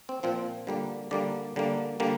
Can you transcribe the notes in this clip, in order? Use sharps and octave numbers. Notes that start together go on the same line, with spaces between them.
C4
A#2 F3 C4
D3 G3 A#3
D3 G3 A#3 D5
D3 G3 A#3
D3 G3 A#3